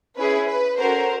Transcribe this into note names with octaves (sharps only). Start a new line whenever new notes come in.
C#4 E4 G#4 B4
B4
C#4 F#4 A4 A#4 C5